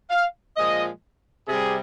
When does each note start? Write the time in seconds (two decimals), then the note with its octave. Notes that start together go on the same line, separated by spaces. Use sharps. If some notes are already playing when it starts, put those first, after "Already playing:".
0.10 F5
0.56 A#2 F3 G#3 D#5
1.48 C3 G3 G#4